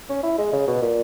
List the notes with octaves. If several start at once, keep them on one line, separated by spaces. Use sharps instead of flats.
C#4
E4
G#3
C#3
B2
A#2